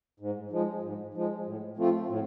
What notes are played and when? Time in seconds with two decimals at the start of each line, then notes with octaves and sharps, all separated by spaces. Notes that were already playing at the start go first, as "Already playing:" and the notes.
0.20 G#2
0.51 F3 G#3
0.82 G#2
1.14 F3 G#3
1.46 A2
1.77 F3 A3 C4 F4
2.09 A2